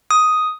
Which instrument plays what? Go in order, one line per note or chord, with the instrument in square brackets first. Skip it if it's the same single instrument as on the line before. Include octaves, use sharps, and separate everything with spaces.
[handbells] D#6